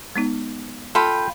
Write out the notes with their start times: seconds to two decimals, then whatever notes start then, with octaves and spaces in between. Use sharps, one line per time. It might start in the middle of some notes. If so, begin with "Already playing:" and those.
0.16 G#3 B3 D#4
0.95 F4 A4 G5 B5